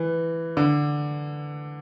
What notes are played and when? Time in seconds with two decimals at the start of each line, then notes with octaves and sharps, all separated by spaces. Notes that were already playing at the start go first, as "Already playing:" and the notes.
Already playing: E3
0.57 D3